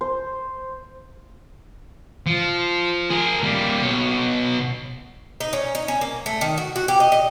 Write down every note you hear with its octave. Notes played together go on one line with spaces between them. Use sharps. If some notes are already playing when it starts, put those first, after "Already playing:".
C5
F3
G#4 A#4
G3 A#3
B2 C#5
D#4
C#4
D#4
C#4
A#3
A3
D#3
F#4
F#4
G4
D#5
D#5